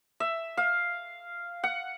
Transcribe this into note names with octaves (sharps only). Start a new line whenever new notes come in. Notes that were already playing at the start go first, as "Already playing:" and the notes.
E5
F5
F#5